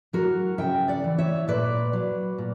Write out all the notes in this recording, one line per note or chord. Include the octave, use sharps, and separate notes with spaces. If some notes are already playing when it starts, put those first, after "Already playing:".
F#3 F#4 A#4
C#3 E5 G5
D5 F#5
E3
C#5 E5
A#2 B4 D5
F#3
A#2